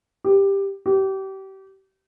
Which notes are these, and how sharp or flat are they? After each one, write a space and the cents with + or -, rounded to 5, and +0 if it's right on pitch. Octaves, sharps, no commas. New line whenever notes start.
G4 +10
G4 -30